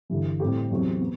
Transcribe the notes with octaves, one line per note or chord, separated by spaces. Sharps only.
G1 G2 E3
A2 G3 C4 G4
E2 C3 F#3 C4
B3